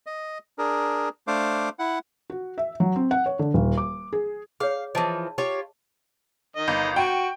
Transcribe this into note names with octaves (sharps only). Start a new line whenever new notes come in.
D#5
D4 G#4 A#4
A3 D4 C5 F5 D6
E4 F#5
F#4
E5
F#3
C4
F#5
C#5
D3
D#1
D6
G#4
G#4 C#5 F5
E3 F3 D#5 A5
F4 G4 C#5
D#3 D#5
G1
F#4 G5